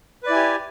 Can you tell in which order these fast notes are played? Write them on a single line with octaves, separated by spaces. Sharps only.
B4 D5 E4 G#5 G4